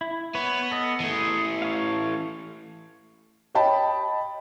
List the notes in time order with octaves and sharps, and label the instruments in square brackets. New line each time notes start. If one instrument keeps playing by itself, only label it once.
[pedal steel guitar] E4
[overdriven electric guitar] B3 [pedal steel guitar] B4 C#5
[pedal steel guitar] A4 D#5
[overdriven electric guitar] E3 A3 [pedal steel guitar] G#4
[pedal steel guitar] C#5 F5
[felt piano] C#5 D#5 G5 A5 B5